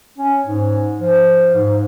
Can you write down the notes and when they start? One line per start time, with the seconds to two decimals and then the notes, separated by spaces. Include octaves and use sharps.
0.18 C#4
0.47 G#2
1.00 F3
1.54 G#2